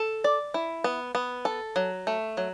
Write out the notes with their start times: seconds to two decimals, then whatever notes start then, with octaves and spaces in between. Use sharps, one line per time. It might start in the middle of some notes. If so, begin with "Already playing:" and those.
Already playing: A4
0.24 D5
0.54 E4
0.84 B3
1.15 B3
1.45 A4
1.76 F#3
2.07 A3
2.37 F#3